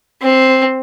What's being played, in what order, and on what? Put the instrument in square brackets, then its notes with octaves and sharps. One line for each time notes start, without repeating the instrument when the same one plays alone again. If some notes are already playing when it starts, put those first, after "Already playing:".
[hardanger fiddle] C4